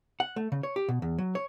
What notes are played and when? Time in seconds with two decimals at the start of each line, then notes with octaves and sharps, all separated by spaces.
0.20 F#5
0.36 A3
0.52 C#3
0.63 C#5
0.76 G4
0.89 B2
1.02 E2
1.18 F#3
1.35 C#5